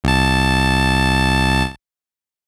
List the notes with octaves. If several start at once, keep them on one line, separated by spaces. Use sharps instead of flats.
C2 A5